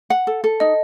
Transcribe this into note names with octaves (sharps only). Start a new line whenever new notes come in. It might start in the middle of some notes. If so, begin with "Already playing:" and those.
F#5
A4
A4
D#4 D#5